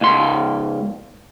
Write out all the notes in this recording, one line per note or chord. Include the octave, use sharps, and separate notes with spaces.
C#2 G#2 C6